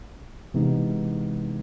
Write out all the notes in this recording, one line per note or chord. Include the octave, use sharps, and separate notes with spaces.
C3 E3 G#3 B3 D#4